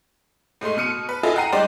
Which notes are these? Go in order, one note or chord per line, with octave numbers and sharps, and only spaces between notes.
A2 G#3 A3 C6
B2 F6 C#7 D#7
B4
E4 F4 G#4 A4 D#5
F#5 G5 A#5 C7 D#7
G3 G#3 D#4 G4 C5 D5